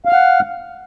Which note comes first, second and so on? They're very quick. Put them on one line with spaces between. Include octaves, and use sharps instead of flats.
F5 F6 F#5